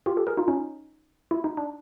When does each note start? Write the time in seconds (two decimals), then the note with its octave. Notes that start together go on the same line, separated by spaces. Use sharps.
0.06 F4 G4
0.17 G4 A4
0.27 G#4 A#4
0.37 D#4 F4
0.48 C#4 D#4
1.31 E4
1.44 D#4
1.57 D4